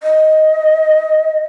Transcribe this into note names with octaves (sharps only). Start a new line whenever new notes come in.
D#5